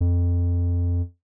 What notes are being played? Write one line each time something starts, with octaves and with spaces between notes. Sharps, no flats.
F2